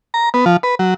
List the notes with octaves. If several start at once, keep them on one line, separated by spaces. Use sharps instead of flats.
A#5
B3
F3
B4
F#3